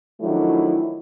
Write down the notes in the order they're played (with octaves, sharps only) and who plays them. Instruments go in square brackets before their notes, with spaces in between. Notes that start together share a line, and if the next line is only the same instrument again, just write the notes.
[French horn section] D#3 F3 F#3 A3 D4 E4